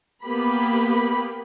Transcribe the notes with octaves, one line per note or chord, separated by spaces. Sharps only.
A#3 B3 G4 B5